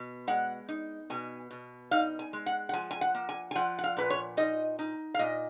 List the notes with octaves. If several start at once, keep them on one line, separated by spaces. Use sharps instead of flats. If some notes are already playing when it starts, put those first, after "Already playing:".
Already playing: B2
G#3 F#5
D#4
B2 G#5
B2
D#4 F5
G#5
G#3
F#5
F#5
F3 G#5
G#5
F#5
A#3
G#5
G#5
F3 F#5
F#5
F5
A#2 B4
C#5
D#4 D#5
D#4
F5
A#2 D#5